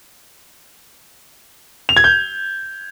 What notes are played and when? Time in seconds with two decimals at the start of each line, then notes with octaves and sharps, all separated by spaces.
1.89 F7
1.96 G#6
2.04 G6